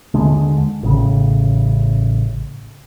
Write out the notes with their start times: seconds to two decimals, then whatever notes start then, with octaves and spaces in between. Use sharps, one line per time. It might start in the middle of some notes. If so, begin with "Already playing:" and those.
0.14 D#2 D3 G#3 D4
0.83 A1 C#3